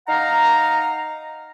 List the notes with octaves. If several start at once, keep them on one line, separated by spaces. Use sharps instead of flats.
D#4 F5 F#5 A#5